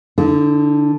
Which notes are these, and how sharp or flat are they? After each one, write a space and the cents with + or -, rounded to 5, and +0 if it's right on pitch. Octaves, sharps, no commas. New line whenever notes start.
D3 +0 D#4 +45